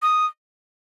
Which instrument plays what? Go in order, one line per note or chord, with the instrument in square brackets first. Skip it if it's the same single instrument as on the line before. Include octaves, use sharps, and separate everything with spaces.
[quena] D#6